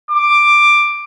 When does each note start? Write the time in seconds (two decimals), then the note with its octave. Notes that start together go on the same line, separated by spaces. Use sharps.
0.11 D6